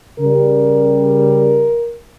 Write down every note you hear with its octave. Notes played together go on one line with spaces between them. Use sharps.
C#3 A#4
G3